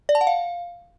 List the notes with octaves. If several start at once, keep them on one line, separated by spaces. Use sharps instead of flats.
D5
A5
F#5
F5